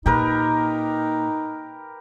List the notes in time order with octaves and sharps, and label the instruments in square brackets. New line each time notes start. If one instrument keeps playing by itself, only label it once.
[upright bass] A#2 [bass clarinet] D#4 [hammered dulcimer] G4 A#4 B4